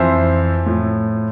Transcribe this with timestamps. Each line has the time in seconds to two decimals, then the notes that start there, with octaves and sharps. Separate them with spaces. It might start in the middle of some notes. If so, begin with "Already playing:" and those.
Already playing: F2 E3 C5 E5
0.66 A2 F3